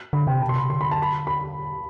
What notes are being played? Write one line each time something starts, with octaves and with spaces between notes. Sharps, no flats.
D3 B5
C3 G5
B2 A5
C6
C3 B5
D3 C6
B5
A5
B5
B5